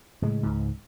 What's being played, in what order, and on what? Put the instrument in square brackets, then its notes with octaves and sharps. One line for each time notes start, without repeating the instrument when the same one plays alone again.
[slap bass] A2 C#3 G#3
C#2 G#2